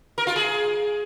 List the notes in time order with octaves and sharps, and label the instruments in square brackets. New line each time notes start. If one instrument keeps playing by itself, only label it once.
[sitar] A#4
F4
G#4